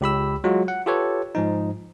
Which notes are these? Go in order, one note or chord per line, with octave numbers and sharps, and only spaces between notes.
C#2 G4 B5 E6
F#3 G#3 F4 F#4
F#5
F4 G4 A4 B4 C#5
G#2 F3 D#4